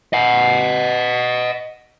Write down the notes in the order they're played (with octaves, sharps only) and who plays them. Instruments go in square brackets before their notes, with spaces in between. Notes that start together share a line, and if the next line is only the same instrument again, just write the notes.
[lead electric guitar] D#5 F#5